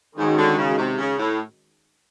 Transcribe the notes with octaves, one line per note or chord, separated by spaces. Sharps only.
G#2 D#3 G#3 C#4 F#4
D3
C#3
C3
C#3
A2